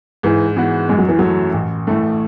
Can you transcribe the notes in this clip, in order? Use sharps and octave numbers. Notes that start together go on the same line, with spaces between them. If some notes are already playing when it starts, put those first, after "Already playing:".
G#2 E3
E3 G#3 B3 F#4
F#2 G#3
F#3
E3
E3 F#3 A3
A1
A2 E3 A3